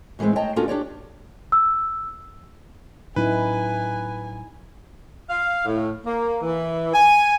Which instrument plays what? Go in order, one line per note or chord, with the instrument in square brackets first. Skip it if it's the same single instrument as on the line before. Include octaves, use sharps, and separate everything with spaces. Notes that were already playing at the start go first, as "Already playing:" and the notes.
[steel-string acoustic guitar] A2 E3 F#3 G#3 C4
C#5 D#5 G5 A5 A#5
A#3 C#4 D4 F4 F#4 A4
D4 G4 C#5 D5
[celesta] E6
[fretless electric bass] A2 F#3 C#4 [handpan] D#4 E4 [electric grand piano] B4 [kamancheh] G#5
[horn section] F5
A2
A#3
E3
G#5